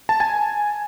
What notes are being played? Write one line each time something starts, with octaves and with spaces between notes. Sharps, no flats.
A5
G#5